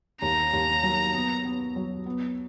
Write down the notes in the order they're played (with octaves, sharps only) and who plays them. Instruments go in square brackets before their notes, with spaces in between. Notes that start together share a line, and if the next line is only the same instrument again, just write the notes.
[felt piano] D#2 [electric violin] A#5
[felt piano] D#2
F#3
B3
B3
F#3
B3